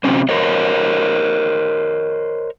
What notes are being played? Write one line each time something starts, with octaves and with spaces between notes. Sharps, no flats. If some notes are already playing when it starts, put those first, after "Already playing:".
C3 F3 F#3 C4 C#4 C5
A#4 C5 C#5 D#5